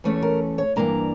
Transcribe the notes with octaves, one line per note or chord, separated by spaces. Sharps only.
E2 E3 A3 C#4 C#5
A#4
C#5
G2 E3 A#3 D4 A#5